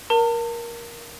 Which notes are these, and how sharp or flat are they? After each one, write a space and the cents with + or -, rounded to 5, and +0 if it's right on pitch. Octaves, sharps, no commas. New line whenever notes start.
A#4 +15 A5 +40